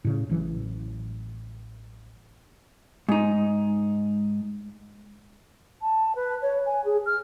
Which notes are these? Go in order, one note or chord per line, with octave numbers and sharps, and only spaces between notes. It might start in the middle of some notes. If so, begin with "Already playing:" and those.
A2 C#3
A1 E3 F#3
G#2 D#4
A5
B4
C#5
G#5
G#4
F6